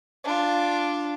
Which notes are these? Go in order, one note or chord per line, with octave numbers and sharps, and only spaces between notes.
D4 F4